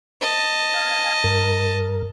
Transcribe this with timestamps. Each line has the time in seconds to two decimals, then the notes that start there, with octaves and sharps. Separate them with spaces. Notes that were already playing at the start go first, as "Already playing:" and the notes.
0.22 D#5 A5
0.74 F5 G#5
1.24 G2 A#4